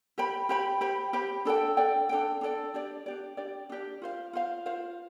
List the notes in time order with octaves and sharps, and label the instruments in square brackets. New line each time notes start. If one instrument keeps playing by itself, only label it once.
[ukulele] G4 C5 G5 B5
G4 C5 G5 B5
G4 C5 G5 B5
G4 C5 G5 B5
D4 A4 D5 G5
D4 A4 D5 G5
D4 A4 D5 G5
D4 A4 D5 G5
D4 G4 D5
D4 G4 D5
D4 G4 D5
D4 G4 D5
F4 C5 F5
F4 C5 F5
F4 C5 F5